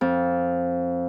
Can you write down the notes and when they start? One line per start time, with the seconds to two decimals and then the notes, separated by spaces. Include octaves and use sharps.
0.01 F2